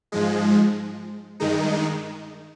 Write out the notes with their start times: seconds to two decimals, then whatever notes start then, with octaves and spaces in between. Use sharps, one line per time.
0.12 G#2 F3 G#3
1.40 G2 D#3 G#3 D#4